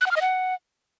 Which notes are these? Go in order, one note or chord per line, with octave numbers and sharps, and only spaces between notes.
F#6
F#5
F6
D#5
F#5